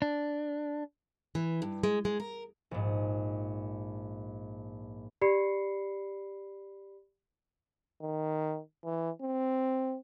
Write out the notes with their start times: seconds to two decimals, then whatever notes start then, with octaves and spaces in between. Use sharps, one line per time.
0.02 D4
1.35 E3
1.62 G2
1.83 G#3
2.05 G#3
2.20 A#4
2.71 A#1 G#2
5.21 G4 D5 B5 C7 C#7
8.01 D#3
8.84 E3
9.22 C4